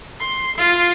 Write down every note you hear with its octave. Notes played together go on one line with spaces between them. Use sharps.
C6
F4